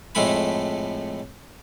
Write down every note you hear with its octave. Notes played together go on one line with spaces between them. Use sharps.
F2 A2 G#3 A3 G#5 B5